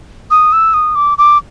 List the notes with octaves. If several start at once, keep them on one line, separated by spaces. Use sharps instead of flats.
D#6
E6
D#6
D6
D6